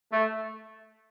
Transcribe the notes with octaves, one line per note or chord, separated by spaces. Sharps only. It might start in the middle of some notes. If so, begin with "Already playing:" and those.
A3